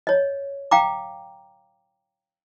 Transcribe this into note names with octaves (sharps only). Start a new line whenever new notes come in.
C#5 D#5
F5 G5 A#5 D6